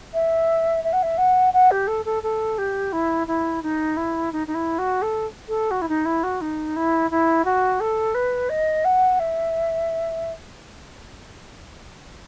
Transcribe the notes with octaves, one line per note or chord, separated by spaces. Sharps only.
E5
E5
F#5
E5
F#5
F#5
G4
A4
A4
A4
G4
E4
E4
D#4
E4
D#4
D#4
E4
F#4
A4
A4
F#4
E4
D#4
E4
F#4
D#4
E4
E4
F#4
A4
B4
D#5
F#5
E5